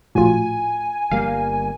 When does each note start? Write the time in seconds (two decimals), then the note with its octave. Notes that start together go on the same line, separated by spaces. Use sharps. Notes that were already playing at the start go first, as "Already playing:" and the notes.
0.15 A#1 A2 F4 F#4 G#5
1.11 G1 G3 A#3 F5